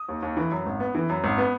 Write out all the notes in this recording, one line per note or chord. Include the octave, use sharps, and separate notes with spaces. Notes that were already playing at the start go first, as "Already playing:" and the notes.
Already playing: D#6
D#2
D#2
E3
F#2
G#1
B3
E3
F#2
G#1
B3